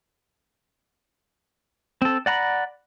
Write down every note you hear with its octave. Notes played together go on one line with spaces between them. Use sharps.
C4 A4
D5 F#5 A#5 B5